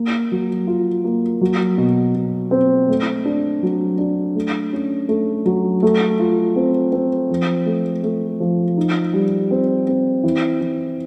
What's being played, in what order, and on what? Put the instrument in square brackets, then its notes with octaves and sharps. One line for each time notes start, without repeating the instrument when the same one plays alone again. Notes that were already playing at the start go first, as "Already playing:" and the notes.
Already playing: [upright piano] A#3
F#3
F4
A#3
F#3
B2
B2
C4
A3
D4
F#3
D4
A3
C#4
A3
F#3
A3
F4
C4
C4
F3
A3
A3
F3
D#4
G3
C4
C4
E3
E3